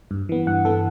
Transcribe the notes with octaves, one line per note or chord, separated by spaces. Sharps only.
G2
E3 B3
G2 F#5
E3 B3 A4